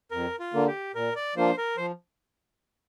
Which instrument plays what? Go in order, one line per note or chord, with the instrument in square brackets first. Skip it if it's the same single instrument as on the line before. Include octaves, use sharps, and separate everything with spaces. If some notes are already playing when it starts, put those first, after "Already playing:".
[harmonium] F2 [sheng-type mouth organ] A#4
[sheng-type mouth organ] F4
[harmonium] D3 A#3
[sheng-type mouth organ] G4
[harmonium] A#2 [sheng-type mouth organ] A#4
[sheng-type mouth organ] D5
[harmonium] F3 A#3 D4 F4 [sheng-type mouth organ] C5
[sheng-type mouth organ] A#4
[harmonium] F3 [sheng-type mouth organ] C5